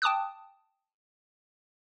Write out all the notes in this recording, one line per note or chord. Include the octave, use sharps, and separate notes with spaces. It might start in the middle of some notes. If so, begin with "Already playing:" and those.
G5 A5 D6 D#6 F#6